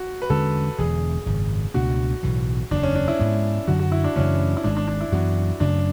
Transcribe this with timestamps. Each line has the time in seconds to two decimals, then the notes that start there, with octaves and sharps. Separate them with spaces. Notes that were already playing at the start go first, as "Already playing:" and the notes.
Already playing: F#4
0.22 B4
0.30 E2 D3 G#3 C#4 A4
0.78 E1 E2 D3 G#4
1.26 G#1 F#2 C#3
1.74 C#2 B2 A3 D4 F#4
2.23 B1 A2 E3
2.71 F#1 E2 C#3 D4
2.83 C#4
2.95 D4
3.08 E4
3.20 G#2 G#3 B3 D4
3.67 F#2 D3 F#3 F#4
3.79 F#4
3.92 E4
4.04 D4
4.16 F#2 C#3 E3 A3 C#4
4.57 E4
4.64 G#1 G#2 G#3 D4
4.77 D4
4.88 D4
5.01 E4
5.12 F#2 E3 B3 F#4
5.60 F#2 C#3 F#3 A3 D4